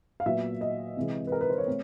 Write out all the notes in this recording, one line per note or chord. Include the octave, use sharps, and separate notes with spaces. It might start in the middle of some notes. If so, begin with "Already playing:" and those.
F5
A#2 F#3 B3 E5
D#5
C3 E3 G#3
B4
A#4
B4
C5
C#5
A3 C4